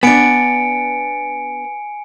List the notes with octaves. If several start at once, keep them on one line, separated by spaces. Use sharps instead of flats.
B3 D4 G#5 C#7 D7